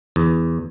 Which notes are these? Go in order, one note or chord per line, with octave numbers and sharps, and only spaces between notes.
E2